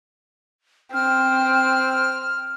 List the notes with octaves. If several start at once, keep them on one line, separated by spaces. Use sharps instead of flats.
C4 F6